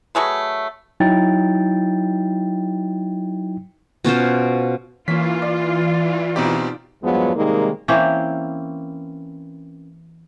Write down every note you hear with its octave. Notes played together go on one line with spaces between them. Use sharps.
F#3 A3 G#4 B4
F#3 D#4 E4 G5 A6
B2 C#4 F4 C5
E3 A#3 C#4 F4 B6
D5
B2 C4 D#4 G4 D6
E2 G2 F3 F#3 G#3 B3
C3 D#3 G3 G#3 A#3 D#4
E3 A#3 C4 C#4